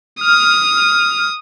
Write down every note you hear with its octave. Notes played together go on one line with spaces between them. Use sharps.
D#6 F6